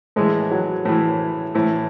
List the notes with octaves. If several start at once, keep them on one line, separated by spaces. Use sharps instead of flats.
A2 E3 G#3
F#3
A2 E3
A2 E3